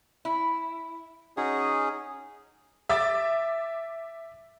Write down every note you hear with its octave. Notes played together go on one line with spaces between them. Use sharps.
E4
C#4 D#4 F#4 G#4
E5 D6 A6